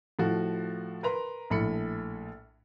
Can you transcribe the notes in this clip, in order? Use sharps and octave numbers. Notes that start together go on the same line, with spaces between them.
A2 F3 F#4
A#4 B4 A#5 C6
A#1 A2 B5 C#7